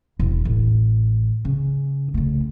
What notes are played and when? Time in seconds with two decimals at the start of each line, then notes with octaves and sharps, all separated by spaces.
0.19 E1
0.45 A1
1.45 C#3
2.14 C#3 A3